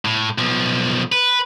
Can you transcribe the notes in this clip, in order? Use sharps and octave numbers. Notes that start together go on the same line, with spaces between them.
A2
B1 F3
B4